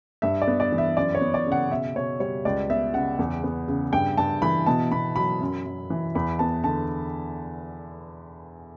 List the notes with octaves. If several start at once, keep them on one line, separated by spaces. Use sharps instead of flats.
G2 E5
D5
B3
D5
E3
E5
F#2 D5
C#5
B3
D5
C#3
F#5
B2 E5
B2 C#5
G3 C#5
C#2 D5
B3 E5
C#3 F#5
E2
B3
C#3
G2 G5
G2 A5
E3 B5
B2 A5
B2 B5
F#3 B5
F#2
F#2
E3
E2 B5
B3 A5
D3 A5